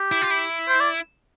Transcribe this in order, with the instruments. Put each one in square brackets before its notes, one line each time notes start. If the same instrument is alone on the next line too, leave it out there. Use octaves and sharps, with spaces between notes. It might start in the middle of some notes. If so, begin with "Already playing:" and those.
Already playing: [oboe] G4
[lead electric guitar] E4
F4
E4
[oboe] C5
D5